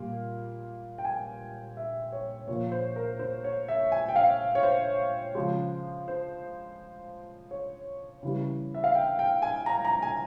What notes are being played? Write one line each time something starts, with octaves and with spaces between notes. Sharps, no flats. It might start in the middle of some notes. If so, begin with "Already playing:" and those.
Already playing: A#2 G3 A#3
G5
G#5
E5
C#5
A#2 F3 A#3 C#5
C5
A#4
C5
C#5
E5
G#5
G5
F5
C#5
C5
C#3 F3 G#3
C5
C#5
C#3 E3 G3
E5
F5
G5
G5
G#5
A#5
A#5
G#5